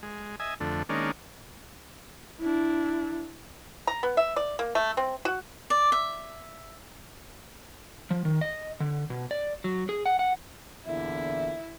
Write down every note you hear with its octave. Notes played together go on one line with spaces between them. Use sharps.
G#3
D#5 E5 G#5
F2 D3 A3
D#3 G#3 A#3 C#4 D4
D4 E4
A#5
B3
E5
D5
A#3
A3
C4
F#4
D5
E5
F3
D#3
D#5
D3
B2
D5
F#3
G#4
F#5
F#5
E2 A#2 D3 E4 E5